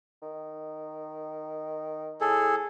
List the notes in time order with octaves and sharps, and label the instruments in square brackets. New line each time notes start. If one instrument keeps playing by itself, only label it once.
[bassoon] D#3
[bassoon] A2 [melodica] G#4 A4